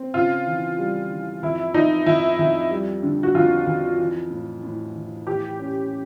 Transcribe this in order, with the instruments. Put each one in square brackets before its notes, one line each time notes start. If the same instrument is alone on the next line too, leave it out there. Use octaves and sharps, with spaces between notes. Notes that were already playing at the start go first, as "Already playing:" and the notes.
Already playing: [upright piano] C4
[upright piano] C#3 [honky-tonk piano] F4
[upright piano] E3
G3
E3
[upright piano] F2 [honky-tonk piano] E4
[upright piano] F2 [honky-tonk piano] D#4
[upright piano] F2 [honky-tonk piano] E4
[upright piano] F2
G3
D3
[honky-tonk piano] F#4
[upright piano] F2 [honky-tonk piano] F4
[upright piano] F2
E3
A2
A2
E3
[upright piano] E3 [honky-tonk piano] G4
[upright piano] C#4